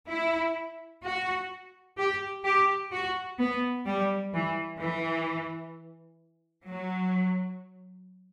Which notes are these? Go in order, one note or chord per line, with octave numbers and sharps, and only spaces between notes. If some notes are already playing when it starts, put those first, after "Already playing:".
E4
F#4
G4
G4
F#4
B3
G3
E3
E3
F#3